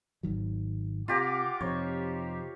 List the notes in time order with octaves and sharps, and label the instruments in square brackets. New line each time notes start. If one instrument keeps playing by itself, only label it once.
[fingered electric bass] G#1 D#3 F#3
[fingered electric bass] C3 [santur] F4 G4 A#5 [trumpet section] F#5 D6
[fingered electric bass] F2 C3 [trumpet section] D#4 G4 C5 [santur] C#5